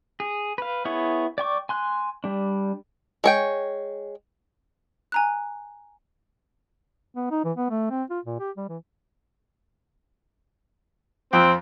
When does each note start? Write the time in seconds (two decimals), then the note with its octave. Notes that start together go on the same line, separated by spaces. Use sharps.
0.20 G#4
0.58 B4 F5
0.85 B3 E4 G#4 C#5
1.38 D5 G5 C#6 D6
1.69 G#5 C6 F#6
2.24 G3 D4
3.24 G#3 C#5 G5
5.12 G#5 A#5 F#6
7.15 B3
7.31 D#4
7.44 E3
7.57 B3
7.70 A3
7.91 C4
8.10 F4
8.25 A#2
8.40 G4
8.57 G3
8.69 E3
11.33 F2 F3 C4